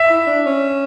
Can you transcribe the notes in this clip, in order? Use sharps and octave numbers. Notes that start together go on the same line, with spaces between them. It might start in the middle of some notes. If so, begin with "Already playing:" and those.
Already playing: E5
E4
D4
C#4